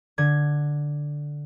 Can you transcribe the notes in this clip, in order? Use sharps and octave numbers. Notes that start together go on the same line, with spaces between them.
D3 G#6